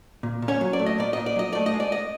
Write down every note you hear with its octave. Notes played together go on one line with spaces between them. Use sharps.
A#2
A#2
C#4 C#5
F#3
D5
A3
D#5
A#2 D5
A#2 D#5
D5
F#3 D#5
A3 D5
D#5
G#3
D5
D#5